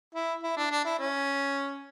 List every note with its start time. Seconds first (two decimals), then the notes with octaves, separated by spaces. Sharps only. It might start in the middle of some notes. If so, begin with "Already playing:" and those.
0.14 E4
0.43 E4
0.56 D4
0.71 D4
0.84 E4
0.99 C#4